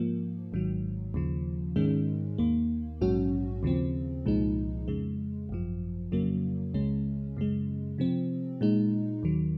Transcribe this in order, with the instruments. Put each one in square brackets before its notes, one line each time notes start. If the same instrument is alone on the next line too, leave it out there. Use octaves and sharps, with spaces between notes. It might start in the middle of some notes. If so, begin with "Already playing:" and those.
Already playing: [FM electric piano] G#2 F3 A#3
G#1 G#2 D#3 F#3
D#2 C#3 F3
G#2 D#3 G#3 C#4
D#2 D#3 A#3
A#1 G#2 F#3 C#4 F#4
D#2 C#3 F3 C4
C2 A#2 F3 G#3 D#4
F2 C#3 G#3
G#1 F#2 F3
F2 C#3 F#3 A#3
C#2 C#3 G#3 C#4
F#2 C#3 G#3
C3 F3 C4
A#2 G#3 D#4
D#2 D#3 F#3